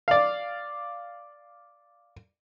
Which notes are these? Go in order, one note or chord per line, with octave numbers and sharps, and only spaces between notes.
D5 F5